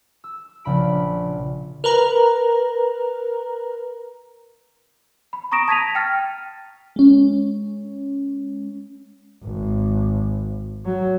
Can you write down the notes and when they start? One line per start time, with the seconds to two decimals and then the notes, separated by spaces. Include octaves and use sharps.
0.24 E6
0.64 A#1 C#3 B5 D7
1.84 A#4 B4 A#5
5.33 B5
5.52 A#5 C#6 D#6 A#6 D7 E7
5.68 A5 G#6 A#6 B6 D#7 F7
5.95 G5 F6 A6
6.96 G#3 C#4
9.44 G#1
10.85 F#3